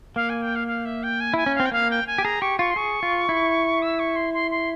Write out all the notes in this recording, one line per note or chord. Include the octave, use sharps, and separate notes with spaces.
A#3 F5
G#5
G5
F5
F5
E5
G5
G#5
E4 G#5
C#4
F5
C4
G5
A#3 F5
G5
G#5
G4
G#4 A#5
G4 C#6
F4 C#6
C6
G#4 C#6
F4
E4
E6
C#6
C6
C6
C6